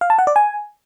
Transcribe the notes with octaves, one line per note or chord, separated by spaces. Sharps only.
F5
A5
F#5
D5
G#5